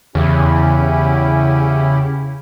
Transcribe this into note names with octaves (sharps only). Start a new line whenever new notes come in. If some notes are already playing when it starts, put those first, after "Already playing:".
E2 C#3 C#4 E4 G4